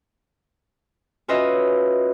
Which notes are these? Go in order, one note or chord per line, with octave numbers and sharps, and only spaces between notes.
C#4 F4 F#4 B4 D#5 E5